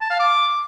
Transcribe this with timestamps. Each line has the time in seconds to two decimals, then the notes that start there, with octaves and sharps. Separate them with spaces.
0.01 A5
0.10 F5
0.20 D6